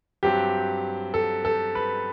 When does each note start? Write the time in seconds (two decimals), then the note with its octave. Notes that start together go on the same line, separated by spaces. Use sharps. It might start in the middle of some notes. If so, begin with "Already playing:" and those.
0.23 G2 F#3 C4 G4
1.14 A4
1.45 A4
1.75 B4